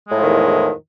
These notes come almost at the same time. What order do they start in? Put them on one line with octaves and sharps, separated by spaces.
G#3 A2 F3 D#3 E2